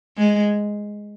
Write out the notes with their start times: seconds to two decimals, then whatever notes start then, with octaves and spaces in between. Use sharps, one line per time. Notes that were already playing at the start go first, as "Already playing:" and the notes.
0.17 G#3